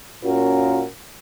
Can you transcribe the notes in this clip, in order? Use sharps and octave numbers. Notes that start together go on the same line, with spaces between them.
A#2 C#4 F4 F#4 A#4